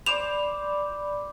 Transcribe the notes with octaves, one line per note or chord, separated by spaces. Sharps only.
C5 D5 B5 D6 E7 F7